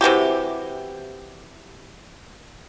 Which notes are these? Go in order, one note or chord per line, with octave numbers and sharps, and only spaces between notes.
C3 E3 F#4 G4